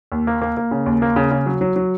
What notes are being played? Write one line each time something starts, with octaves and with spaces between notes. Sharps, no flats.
D#2
A#3
A#3
A#3
C#3
D#2
A#3
C#3
C#3
F#3
F#3
F#3